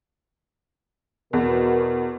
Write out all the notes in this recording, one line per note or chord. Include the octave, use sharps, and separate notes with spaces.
E2 B2 A#4